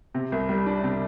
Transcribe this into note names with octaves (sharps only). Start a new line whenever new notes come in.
C3
C2
G3
D4
C3